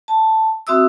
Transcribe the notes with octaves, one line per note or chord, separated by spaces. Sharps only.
A5
C4 F#4 E5 D#6 E6